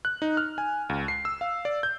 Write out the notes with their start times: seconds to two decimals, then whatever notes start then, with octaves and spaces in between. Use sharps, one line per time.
0.05 F#6
0.22 D#4
0.37 F6
0.58 G#5
0.89 C#2
1.08 C7
1.25 E6
1.41 F5
1.65 D5
1.83 G6